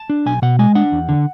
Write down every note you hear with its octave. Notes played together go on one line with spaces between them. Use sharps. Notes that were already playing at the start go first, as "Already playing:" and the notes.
Already playing: A5
D4
B1 G#5
B2 F#5
G#3 G#5
D4 F#5
E2
D3